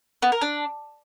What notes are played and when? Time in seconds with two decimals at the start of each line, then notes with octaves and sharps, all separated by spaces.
0.22 B3
0.32 A#4
0.42 D4